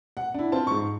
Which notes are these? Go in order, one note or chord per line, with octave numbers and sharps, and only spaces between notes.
F#5
D4 E4
C4 F4 C5 A5
G#2 C#6